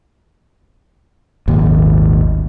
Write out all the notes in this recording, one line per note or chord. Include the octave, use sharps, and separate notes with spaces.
D#1 G#1 D#2